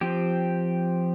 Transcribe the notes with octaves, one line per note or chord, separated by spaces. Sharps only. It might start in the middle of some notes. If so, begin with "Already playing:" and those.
F3 C4 G4